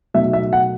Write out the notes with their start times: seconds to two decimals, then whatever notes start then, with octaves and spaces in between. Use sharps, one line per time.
0.14 B2 F#3 A3 D#4 E5
0.33 E5
0.53 F#5